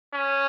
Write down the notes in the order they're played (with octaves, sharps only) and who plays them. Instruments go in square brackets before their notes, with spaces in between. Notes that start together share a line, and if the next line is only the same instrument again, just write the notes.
[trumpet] C#4